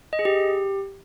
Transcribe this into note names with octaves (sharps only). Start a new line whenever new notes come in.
D#5
G#4
G4